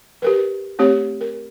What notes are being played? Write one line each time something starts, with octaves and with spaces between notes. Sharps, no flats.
G4 A#4 B4
A3 C4 G4 C#5
A#4